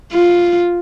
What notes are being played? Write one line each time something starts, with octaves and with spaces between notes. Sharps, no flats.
F4